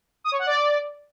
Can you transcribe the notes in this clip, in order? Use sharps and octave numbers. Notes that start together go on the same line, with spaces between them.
D#6
C#5
F#5
D5